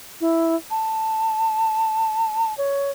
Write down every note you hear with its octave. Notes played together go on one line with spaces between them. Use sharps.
E4
A5
C#5